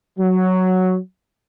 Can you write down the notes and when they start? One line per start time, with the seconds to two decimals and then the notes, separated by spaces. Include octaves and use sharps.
0.18 F#3